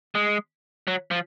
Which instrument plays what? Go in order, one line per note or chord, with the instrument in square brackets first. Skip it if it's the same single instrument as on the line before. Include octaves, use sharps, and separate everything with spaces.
[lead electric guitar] G#3
F#3
F3